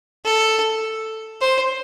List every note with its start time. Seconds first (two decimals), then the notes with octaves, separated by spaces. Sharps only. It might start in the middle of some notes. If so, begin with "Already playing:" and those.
0.25 A4
1.41 C5